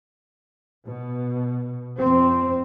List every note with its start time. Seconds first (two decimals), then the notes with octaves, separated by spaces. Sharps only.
0.87 B2
1.98 F2 C4